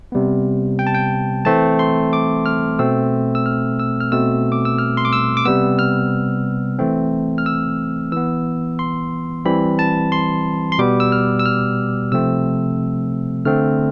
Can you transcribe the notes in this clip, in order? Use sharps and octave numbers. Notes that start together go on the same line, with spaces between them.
C3 G3 B3
G5
A5
G5
E3 A3 C4 A5
C6
D6
F6
B2 A3 C4 E6
E6
F6
E6
F6
B2 A3 C4 E6
D6
E6
F6
C6
D6
E6
D6
C3 G3 B3 E6
F6
E3 A3 C4
F6
E6
E3 B3 E6
C6
E3 G3 C4 B5
A5
C6
C6
B2 G3 B3 D6
E6
F6
E6
F6
C3 F3 A3 C4 E6
D3 A3 C4 F6